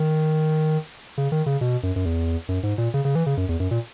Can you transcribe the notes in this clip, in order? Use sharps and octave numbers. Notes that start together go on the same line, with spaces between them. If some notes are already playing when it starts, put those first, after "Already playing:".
Already playing: D#3
C#3
D#3
C#3
B2
F#2
F#2
E2
F#2
G#2
A#2
C#3
C#3
E3
C#3
F#2
E2
F#2
A#2